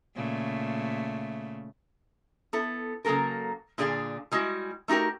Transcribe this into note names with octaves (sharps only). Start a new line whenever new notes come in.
A#2 C#3 A3
B3 E4 A4
C#3 F#3 A#3 A4 A#4
A#2 D3 D4 G#4 D5 F5
G3 G#3 E4 F#4
A3 D#4 F#4 G4 A#4